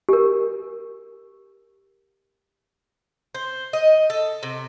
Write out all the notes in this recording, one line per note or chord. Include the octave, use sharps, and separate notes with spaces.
G4 A#4
C5
D#5
A4
C3